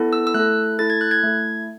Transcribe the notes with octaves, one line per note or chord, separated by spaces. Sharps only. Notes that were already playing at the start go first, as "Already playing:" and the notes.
Already playing: B3 E4 A4
E6
E6
A3 E4 A4 F#6
A3 E4 A4 A6
G#6
F#6
G#6
A3 E4 A4